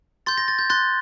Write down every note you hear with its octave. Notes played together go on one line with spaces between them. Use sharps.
C6 G6 A6
A#6
A6
G6
C6 F#6 A6